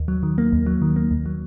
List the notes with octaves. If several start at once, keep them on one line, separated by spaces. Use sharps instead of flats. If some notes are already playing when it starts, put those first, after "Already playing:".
Already playing: D#2
F#3
D#3
A#3
D#2
F#3
D#3
A#3
D#2
F#3